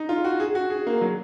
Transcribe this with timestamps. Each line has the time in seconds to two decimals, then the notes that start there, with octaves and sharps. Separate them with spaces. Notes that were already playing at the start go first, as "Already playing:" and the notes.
Already playing: D#4
0.09 F4
0.24 F#4
0.40 G#4
0.55 F#4
0.70 G#4
0.87 A#3
1.01 F#3